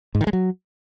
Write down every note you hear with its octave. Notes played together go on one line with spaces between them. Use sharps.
G#2
D#3
G#3
F#3